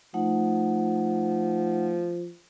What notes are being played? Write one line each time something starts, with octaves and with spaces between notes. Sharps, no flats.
F3 A3 D#4 F#5